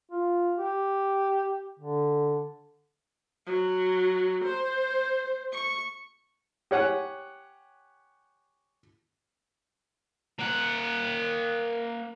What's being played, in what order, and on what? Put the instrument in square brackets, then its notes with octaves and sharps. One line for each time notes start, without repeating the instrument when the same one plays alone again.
[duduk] F4
G4
D3
[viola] F#3
C5
C#6
[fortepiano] G4 C#5 F#5 G#5
[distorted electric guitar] A#3 F#5